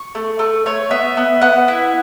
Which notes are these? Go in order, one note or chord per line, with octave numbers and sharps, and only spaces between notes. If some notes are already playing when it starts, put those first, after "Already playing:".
Already playing: C#6
A3
A3 C#6
A3 C#5
B3 E5
B3
B3 F#5
E4